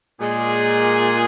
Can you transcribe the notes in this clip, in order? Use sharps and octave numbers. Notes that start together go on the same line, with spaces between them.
A#2 G#3 G#4